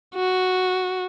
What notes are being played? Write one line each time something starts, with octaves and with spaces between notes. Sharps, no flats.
F#4